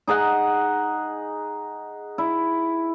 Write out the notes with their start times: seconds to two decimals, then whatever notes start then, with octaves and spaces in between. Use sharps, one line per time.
0.07 D#4 G#4 D#5 F#5
2.18 E4